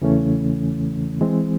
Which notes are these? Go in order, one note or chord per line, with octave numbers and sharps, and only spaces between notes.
E2 C#3 E3 A3 C#4
E3 G#3 C4